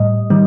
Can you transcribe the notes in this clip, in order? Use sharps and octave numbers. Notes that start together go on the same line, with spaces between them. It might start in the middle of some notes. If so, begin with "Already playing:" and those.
Already playing: A2 G3 D#5
D#3 G3